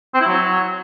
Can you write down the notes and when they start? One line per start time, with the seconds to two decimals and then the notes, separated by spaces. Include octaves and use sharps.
0.14 C4
0.20 E4
0.27 F#3